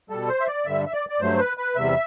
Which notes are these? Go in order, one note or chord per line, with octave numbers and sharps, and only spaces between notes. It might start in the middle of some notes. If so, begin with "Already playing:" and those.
B2 G3 A4
C5
E5
D5
G2 D3 G3 E5
E5
D5
D5
G2 F#3 A3 C5
B4
B4
E2 C3 G3 E5